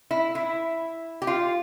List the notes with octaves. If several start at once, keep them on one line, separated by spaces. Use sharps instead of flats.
E4
E4
G4
F4